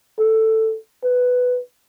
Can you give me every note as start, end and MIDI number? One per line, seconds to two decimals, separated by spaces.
0.19 0.77 69
1.04 1.59 71